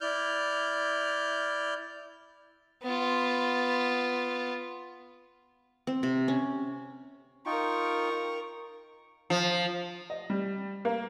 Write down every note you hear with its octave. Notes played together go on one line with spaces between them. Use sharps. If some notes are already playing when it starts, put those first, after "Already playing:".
E4 D5 F6 G6
B3 F4
C4
C3
C#4
D#4 F4 A#4 G5 C#6
F3
D#5
G3
A#3